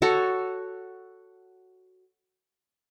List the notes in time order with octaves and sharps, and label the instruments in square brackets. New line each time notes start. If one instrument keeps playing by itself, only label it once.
[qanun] F#4 A4 C#5